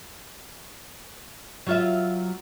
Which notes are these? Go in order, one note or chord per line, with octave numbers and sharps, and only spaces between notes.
F#3 F4 E5